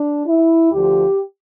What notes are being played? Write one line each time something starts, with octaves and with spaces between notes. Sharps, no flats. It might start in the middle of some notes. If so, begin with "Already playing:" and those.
Already playing: D4
E4
D2 D3 F3 G4